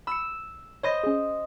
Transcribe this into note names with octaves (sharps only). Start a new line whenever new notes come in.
B5 E6 C#7
C5 C#5 D#5 B5 A#6
C#4 G#4